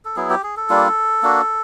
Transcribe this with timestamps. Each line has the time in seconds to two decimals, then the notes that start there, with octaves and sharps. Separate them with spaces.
0.05 A4
0.16 F#3 B3 E4 G#4
0.30 G4
0.43 G#4
0.57 A4
0.69 G3 A#3 D4 F4
1.23 A#3 D4 F#4